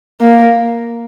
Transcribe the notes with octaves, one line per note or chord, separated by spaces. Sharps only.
A#3